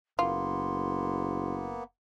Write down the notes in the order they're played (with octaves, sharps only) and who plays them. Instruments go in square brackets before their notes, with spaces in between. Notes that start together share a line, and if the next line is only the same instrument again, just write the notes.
[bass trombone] F#1 [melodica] A#3 B3 [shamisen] F4 [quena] C6